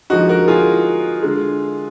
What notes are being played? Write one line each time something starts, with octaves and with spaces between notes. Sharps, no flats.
D3 F3 G#3 D#4 F#4
F#4 A#4
F4 G#4
D3 G#3